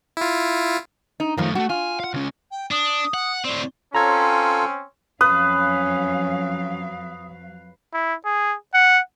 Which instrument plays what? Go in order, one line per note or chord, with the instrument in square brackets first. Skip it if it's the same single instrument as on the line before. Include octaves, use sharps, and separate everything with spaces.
[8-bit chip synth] E4 F4
[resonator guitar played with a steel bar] D#4
[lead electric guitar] F#2 A3 [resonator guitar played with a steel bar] D#3 F3
[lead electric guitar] G3 A3 [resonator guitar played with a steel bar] F#4
[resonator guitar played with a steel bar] F4 [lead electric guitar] G#5
[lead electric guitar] F5 F#5
C#2 C#4
[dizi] G5
[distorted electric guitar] D4 [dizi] D#6
[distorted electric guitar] F#5
[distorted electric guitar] A2 C4 [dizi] D5
[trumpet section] C4 C#4 [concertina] F4 A4 [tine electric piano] A#5 G#6
[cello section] F2 F#3 F5 [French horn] C#4 [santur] B4 [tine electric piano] D#6
[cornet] E4
G#4
F#5